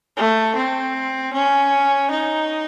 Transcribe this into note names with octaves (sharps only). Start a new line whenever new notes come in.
A3
C4
C#4
D#4